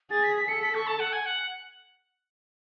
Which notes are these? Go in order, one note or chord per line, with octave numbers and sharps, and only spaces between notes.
G#4 A6
B6
B6
A4 C#7
B6
C#6
A5
F#5
G#5
F#5